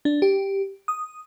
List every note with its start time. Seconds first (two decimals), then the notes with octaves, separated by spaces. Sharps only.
0.05 D4
0.22 G4
0.88 D#6